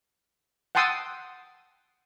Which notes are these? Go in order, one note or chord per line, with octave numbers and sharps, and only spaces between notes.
F#5 G5 A5 C6 D#6 E6